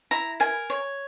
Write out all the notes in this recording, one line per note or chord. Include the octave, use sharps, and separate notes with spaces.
E4 A#5
A#4 G#5
C#5